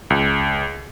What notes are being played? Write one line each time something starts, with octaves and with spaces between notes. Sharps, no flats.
C#2